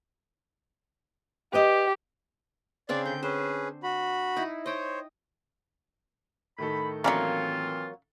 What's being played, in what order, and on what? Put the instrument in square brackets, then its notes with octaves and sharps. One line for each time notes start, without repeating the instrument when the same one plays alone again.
[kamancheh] G4 [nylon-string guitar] B4 D5 D#5
[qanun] C#3 C4 D4 [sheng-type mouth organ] D5
[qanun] D3 [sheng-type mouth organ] G6
[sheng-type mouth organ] C#4 G#4 B4 [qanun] C5
[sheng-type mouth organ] F#4 B5
[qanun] D#4 E4
[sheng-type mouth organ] C5 C#5 [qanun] D#5 G5
[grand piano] A2 D#3 A4 [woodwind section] B5
[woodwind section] E3 C4 F4 [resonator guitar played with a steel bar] F#3 A#3 [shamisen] C#4 D5 E5